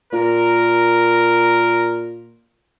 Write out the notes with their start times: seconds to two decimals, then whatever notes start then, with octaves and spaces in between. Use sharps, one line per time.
0.13 A#2 A#4